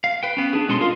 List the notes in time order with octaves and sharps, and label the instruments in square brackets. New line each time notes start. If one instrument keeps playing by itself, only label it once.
[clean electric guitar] F5
B4 G5
B3 C#4
D4 G#4
B2 G#3 C#4 A4 D#5 C6
F4 A#4 F5